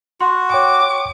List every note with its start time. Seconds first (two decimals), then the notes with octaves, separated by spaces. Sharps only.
0.21 F#4 C6
0.50 C#5 G5 C#6 D6